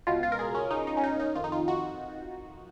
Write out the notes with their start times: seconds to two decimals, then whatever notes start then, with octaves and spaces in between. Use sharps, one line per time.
0.07 C#2 B2 F4
0.23 F4
0.32 A#4
0.39 G#4
0.55 C#4
0.71 D#4
0.87 D#4
0.97 C#4
1.04 D#4
1.20 D#4
1.36 F2 D#3 F4
1.44 D#4
1.52 F4
1.68 F#4